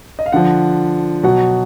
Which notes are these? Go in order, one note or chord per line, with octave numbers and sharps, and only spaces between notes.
D#5
F5
D3 F3 F#5
B2 F#3 F#5